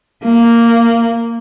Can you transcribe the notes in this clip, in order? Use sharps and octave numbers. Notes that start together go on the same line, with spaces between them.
A#3